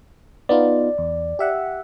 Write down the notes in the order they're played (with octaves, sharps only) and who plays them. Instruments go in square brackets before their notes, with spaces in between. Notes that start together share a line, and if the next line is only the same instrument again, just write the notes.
[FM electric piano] B3 D#4 F4 [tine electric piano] D5
[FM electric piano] E2
G4 E5 F#5